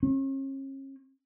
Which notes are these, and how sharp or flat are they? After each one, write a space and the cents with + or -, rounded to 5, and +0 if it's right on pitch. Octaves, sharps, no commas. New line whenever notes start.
C#4 -40